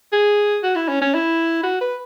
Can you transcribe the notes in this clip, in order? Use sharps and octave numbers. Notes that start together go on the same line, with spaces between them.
G#4
F#4
E4
C#4
C#4
E4
F#4
B4